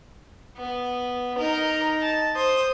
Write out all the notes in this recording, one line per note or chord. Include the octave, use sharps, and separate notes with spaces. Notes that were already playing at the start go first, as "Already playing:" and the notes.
B3
D#4 A#4 D#5
A5
C5 D#6